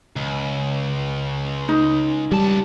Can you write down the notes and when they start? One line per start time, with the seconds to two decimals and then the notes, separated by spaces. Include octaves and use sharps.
0.16 C#2
1.69 D#4
2.32 C#2 G3 A5